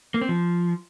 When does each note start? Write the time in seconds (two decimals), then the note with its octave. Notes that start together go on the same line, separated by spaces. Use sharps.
0.14 A#3
0.22 C4
0.29 F3